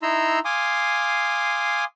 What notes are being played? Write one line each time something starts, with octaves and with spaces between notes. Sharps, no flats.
D#4 E4 A#5 C6 E6
F5 G#5 C6 D6 D#6